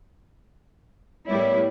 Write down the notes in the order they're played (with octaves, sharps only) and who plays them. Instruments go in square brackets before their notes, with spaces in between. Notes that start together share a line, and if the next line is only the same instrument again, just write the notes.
[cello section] A2 G3 E4 [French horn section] B3 A#4 C#5